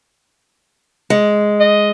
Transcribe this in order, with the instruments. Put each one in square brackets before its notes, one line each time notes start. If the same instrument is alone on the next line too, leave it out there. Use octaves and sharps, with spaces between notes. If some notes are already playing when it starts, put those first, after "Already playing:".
[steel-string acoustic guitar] G#3
[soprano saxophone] D#5